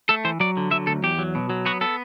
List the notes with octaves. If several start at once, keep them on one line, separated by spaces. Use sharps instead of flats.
A3 A4
E3 C5
F#3 D5
D3
F#3 E5
D2 A4
E2 G4
F#3
B2
F#3
B3 F#4
B3 A4